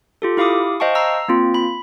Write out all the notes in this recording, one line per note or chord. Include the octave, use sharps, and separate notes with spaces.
F4 G4 A4
E4 G4 F5 B5 D6 D#6
C5 D#5 F5 G5 A5 C#6
A#5 E6 C7
A#3 C4 F4
B5